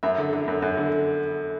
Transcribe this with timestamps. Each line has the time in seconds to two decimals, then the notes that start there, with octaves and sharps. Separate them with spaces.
0.03 F#2 E5
0.18 D3
0.33 D3
0.48 F#2
0.62 F#2
0.77 D3